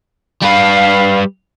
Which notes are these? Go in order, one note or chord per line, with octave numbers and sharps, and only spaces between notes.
G3 B4 F5